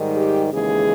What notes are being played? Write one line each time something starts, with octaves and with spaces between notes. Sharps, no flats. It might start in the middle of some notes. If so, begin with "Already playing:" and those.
Already playing: G#2 D#3 G3
G4
D#2 C#3 E3 G#3 G#4